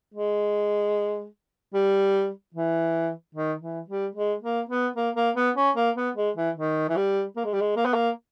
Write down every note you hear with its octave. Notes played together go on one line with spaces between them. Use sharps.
G#3
G3
E3
D#3
E3
G3
G#3
A#3
B3
A#3
A#3
B3
C#4
A#3
B3
G#3
E3
D#3
E3
G3
A#3
G#3
G3
G#3
A#3
B3
A#3